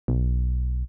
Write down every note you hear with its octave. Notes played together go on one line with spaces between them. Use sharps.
B1